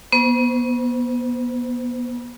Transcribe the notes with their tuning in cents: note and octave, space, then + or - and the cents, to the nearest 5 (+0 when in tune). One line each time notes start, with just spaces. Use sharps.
B3 -35 C5 -30